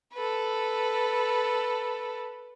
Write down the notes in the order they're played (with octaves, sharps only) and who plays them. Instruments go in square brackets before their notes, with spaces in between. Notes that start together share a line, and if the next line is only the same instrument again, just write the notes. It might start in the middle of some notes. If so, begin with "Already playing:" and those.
[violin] A4 B4